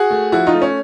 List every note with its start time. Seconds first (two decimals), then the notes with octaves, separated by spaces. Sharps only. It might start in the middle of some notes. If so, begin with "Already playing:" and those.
Already playing: F#4 G#4
0.10 A3
0.32 F3 E4 F#4
0.46 D#4 F4
0.54 A3
0.62 C#4